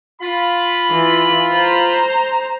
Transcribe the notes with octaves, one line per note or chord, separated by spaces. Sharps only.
F4 B5
E3
C5 A#5